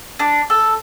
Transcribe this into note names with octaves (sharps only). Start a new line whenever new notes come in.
D4
A4